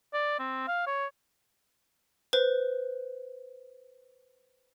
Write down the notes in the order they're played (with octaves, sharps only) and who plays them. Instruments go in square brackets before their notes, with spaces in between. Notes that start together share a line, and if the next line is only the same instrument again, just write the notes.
[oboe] D5
C4
F5
C#5
[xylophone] B4 C5